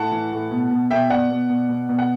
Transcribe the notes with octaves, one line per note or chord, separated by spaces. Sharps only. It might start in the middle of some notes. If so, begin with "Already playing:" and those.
Already playing: A2 F#5 A5
E3
A2
B2
B2
B2 E5 G5
B2 D5 F#5
B2
B2
B2
B2
F#5